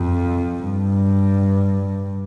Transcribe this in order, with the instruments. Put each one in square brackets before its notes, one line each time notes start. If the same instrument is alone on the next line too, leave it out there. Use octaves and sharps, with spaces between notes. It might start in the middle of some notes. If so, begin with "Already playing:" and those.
Already playing: [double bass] F2
G2